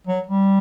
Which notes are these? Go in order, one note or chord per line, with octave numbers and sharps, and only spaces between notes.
F#3
G3